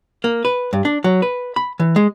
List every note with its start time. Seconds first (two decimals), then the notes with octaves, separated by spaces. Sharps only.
0.24 A#3
0.45 B4
0.73 G2
0.85 D4
1.04 F#3
1.22 B4
1.56 B5
1.80 E3
1.96 G#3